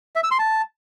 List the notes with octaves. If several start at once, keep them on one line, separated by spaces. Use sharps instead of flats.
E5
E6
C6
A5